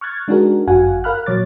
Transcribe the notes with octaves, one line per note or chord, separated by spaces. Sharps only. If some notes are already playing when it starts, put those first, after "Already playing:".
C#6 F6 F#6 G#6 A6
G#3 D4 D#4 F#4 G#4 A#4
G1 F#2 F#4 F5 F#5 G#5
A#4 F5 B5 F6 F#6
A#2 F#3 C#5 D6 A6